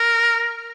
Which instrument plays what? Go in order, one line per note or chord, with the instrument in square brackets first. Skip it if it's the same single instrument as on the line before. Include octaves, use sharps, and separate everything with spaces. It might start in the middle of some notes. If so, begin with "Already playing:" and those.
Already playing: [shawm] A#4